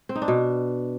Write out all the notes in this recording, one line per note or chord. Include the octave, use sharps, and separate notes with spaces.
C4
D#4
D4
B2